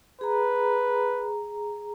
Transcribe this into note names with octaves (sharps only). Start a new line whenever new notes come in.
G#4 B4 A#5